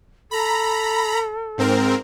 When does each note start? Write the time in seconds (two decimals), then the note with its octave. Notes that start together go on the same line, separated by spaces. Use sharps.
0.31 A4 A#5 B5
1.58 G#2 C4 A#4